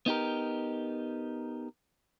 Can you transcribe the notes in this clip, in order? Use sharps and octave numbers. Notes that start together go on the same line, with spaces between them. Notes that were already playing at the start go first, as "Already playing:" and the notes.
B3 D#4 G4 A#4